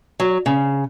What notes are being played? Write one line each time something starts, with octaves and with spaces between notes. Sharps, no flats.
F#3
C#3